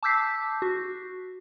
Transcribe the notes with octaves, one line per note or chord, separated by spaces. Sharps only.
A5 D6 E6 G6 B6 C7
F#4